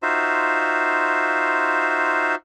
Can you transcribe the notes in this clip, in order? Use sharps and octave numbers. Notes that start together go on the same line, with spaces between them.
D#4 F4 F#4 C5 E5